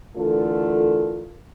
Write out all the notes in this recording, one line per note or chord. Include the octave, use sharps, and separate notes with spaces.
D3 E3 A3 F4 A4 A#4